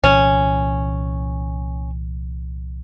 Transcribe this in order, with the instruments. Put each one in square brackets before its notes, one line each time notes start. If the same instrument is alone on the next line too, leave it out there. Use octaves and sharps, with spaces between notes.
[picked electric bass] C2 A#2 E3 [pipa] C#4